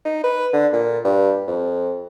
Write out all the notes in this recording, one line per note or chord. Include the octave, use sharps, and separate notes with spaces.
D#4
B4
D3
A#2
G2
F2